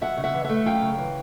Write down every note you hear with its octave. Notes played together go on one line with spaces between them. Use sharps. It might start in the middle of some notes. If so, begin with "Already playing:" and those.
F#2 E5 F#5
C#3
E5 F#5
E3
A3 E5 F#5
F#2 F5 G5
C#3
E3